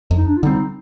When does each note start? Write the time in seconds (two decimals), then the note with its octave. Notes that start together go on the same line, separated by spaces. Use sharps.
0.11 F2
0.17 D#4
0.27 D4
0.37 F4
0.43 D3 G3 C4 D#4